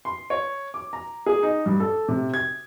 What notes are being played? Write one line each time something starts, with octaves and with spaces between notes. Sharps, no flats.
C6
C#5
D6
A#5
G#4
D#4
G2
A4
C3
G#6